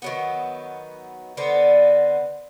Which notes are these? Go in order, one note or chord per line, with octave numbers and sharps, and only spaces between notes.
D#3 F#3 B3
D3 B3 C4